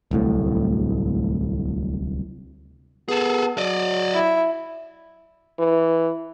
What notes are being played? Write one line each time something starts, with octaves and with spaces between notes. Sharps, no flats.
D1 C2 A2
B3 G#4 A4
F#3 D5 D#5
E4
E3